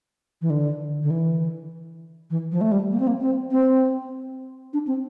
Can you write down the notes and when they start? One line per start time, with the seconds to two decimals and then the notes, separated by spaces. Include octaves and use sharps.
0.42 E3
0.50 D3
1.03 D3
1.10 E3
2.30 E3
2.52 F3
2.61 A3
2.72 G3
2.91 A#3
3.00 C4
3.07 A#3
3.21 C4
3.51 C4
4.73 D4
4.87 C4